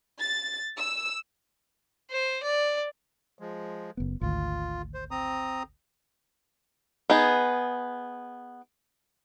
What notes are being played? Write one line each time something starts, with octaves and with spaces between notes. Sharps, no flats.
A6
E6
C5
D5
F3 G#3
F#1 B3
G#1 D2 F4
C5
C4 A#5 D#6
B3 D#4 G#4